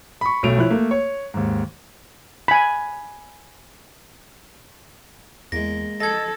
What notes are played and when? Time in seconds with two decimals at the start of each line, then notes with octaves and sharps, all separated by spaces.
0.21 B5 C#6
0.43 B1 F#3 A3 D7 F7
0.57 F3 E4 C#5 F#6
0.70 A3 A#3
0.91 C#5
1.34 D#2 G#2
2.48 G#5 B5
5.52 E2 G#3 A#3 A#6
6.00 A4 D#5 G#6 A#6